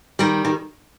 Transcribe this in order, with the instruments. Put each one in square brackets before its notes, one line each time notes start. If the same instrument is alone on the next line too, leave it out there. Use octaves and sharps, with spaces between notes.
[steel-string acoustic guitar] D#3 G3
D#3